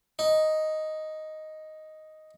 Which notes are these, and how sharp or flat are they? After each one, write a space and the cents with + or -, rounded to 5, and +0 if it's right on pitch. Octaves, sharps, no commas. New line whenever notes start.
D#4 +5